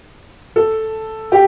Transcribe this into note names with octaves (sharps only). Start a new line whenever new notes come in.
A4
G4